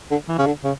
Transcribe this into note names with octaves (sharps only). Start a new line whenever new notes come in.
D3
E3
C#3
D3
C#3